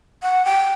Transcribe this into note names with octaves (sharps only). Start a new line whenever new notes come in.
F#5
G5